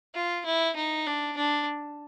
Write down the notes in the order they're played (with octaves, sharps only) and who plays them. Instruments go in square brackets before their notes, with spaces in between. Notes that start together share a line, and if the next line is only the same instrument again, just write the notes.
[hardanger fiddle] F4
E4
D#4
D4
D4